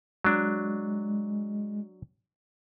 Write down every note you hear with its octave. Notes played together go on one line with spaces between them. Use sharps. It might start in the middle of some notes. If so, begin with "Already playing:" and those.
F#3 G#3 D4